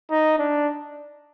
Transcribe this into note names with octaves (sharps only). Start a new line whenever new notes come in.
D#4
D4